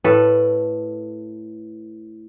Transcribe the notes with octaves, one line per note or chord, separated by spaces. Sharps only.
A2 A4 B4